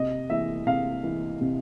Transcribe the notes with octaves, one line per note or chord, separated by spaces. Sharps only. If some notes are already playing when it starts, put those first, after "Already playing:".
Already playing: C3 D#5
E3 E5
C3 F5
E3
C3